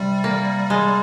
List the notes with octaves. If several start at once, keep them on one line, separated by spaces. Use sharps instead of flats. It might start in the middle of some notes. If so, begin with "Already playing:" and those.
Already playing: C3 G3
A#3
G#3